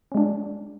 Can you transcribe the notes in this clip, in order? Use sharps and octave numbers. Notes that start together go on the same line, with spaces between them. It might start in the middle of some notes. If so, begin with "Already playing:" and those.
G#3 C#4 D4